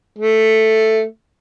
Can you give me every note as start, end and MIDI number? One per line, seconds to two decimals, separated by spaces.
0.18 1.03 57